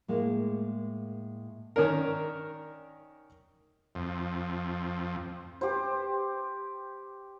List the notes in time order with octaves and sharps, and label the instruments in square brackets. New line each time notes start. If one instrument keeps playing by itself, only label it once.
[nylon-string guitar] A2 G#3 A#3
[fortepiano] D#3 C#4 D4 A#4
[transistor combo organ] F2
[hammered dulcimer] G4 C5